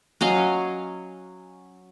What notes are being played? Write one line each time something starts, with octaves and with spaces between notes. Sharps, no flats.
F#3 C#4 D#5 F5